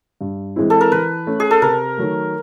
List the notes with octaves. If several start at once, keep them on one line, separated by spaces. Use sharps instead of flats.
G2
E3 G#3 C4 E4
A4
A#4
E3 B4
A3 C#4
G#4
A4
C3 A#4
D#3 F#3 A3